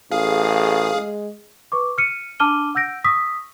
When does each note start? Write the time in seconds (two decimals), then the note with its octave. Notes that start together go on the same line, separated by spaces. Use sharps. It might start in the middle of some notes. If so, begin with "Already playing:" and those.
0.11 A1 G#4 F5
0.95 G#3
1.72 B4 C#6 D6
1.98 F6 C#7 D#7
2.40 D4 A5 D6 F6 D#7 G7
2.75 F#5 E6 G6 A#6 D7
3.04 C#6 D#6 E6 A#6 B6